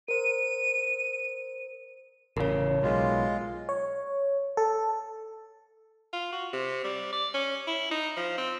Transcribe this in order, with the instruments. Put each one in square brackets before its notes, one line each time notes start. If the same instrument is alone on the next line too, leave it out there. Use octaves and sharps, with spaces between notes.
[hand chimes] A#4 C5 [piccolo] D#7
[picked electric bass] A1 C#3 [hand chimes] A#4 C#5
[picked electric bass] B1 [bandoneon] G#3 F4
[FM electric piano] C#5
A4
[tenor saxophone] F4
F#4
C3
G3
D5
C#4
E4
D#4
F3
C4